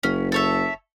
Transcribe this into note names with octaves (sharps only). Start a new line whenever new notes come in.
F#1 C#4
A4 C#5 E5